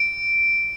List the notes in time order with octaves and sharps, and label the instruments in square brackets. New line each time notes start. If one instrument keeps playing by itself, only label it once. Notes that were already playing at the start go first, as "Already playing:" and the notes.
Already playing: [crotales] D7